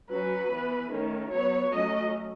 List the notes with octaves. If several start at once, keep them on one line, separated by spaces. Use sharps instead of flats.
F#3 C#4 B4
E3 B3
D#3 A3 C#4
F#3 B3 C#5
F#3 A3 C#4 D#5